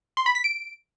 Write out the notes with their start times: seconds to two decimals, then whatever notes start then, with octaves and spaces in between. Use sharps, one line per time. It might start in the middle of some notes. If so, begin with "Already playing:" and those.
0.17 C6
0.26 B5
0.35 B6
0.44 D7